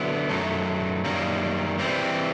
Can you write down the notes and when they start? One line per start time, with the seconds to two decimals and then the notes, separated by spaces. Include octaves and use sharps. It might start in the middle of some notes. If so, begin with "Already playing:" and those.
Already playing: D3 F#3 B3 E4
0.30 F#2 D#3 F#3 A3
1.05 F#2 D#3 G3 A#3
1.79 E3 G3 C4